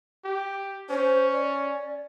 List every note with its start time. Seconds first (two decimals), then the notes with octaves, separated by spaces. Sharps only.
0.24 G4
0.90 C#4 C5
1.31 D5